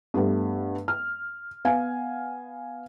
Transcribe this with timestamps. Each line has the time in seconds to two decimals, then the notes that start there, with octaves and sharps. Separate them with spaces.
0.14 G2 G3 A3 B3
0.88 F6
1.65 B3 F5 G#5